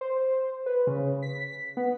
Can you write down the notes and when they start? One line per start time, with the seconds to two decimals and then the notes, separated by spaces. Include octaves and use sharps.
0.01 C5
0.66 B4
0.87 C#3
1.22 B6
1.77 B3